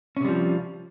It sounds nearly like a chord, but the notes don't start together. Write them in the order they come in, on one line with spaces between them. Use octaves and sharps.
C#4 C3 G3 F3